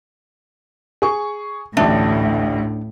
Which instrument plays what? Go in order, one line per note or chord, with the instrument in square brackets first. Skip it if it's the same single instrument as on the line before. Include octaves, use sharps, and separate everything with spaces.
[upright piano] G#4 C#6
[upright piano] A1 D2 E5 [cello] A2 [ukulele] D4